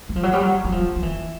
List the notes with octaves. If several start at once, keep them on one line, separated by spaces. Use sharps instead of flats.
F#3
F3
F#3
G3
F#3
F#3
F3
F3
E3